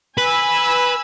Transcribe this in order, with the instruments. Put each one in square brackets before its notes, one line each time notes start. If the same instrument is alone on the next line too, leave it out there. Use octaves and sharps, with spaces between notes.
[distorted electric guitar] B4 [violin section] G#5 B5 E6